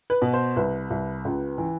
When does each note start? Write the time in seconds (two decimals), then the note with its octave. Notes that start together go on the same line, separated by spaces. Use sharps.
0.10 B4
0.22 B2
0.34 C5
0.56 C2 B4
0.90 C2
1.25 C#2
1.58 E3